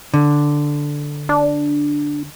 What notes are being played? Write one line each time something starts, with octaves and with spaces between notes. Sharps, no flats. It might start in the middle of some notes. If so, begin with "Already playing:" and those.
D3
D4